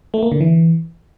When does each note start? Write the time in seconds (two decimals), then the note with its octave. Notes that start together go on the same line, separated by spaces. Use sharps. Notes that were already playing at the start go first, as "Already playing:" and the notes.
0.14 A3
0.23 A#3
0.32 D3
0.41 E3